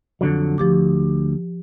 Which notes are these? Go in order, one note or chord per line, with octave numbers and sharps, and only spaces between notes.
F2 D3 F#3
D2 F3 G4 D6